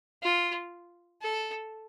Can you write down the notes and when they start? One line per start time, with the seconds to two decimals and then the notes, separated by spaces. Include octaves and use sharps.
0.23 F4
1.22 A4